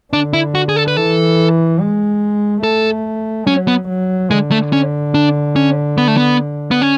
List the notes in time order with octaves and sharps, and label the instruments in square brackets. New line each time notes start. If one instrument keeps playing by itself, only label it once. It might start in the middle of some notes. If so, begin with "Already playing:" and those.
[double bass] D3 [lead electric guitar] D4
[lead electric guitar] E4
F#4
G#4
A4
B4
[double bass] E3 [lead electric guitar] A4
[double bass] G#3
[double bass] A3 [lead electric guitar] A4
[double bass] F#3 [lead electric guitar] C#4
[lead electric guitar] B3
[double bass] F#3
[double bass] D3 [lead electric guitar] G#3
[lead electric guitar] A3
C#4
D4
C#4
B3
A3
B3
B3
C#4